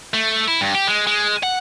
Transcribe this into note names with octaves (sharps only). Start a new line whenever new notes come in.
A3
E4
G2
G4
G#3
G#3
F#5